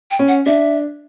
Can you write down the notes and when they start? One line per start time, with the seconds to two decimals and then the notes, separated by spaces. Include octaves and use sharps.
0.11 G5
0.19 C#4
0.28 F#5
0.46 D4 E5